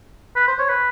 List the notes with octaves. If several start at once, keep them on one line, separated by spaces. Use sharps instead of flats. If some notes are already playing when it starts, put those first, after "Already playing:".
B4
C5
C#5
B4